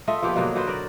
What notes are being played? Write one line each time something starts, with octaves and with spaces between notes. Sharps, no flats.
A3 F4 D#5 E5
F3 A#3 B3 G4
B2 D3 F#3 A#3
B2 F#4 B4 C5
A#4 D5